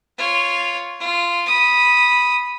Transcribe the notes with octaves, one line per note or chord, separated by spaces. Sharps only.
F4 C#5
F4
B5 D#6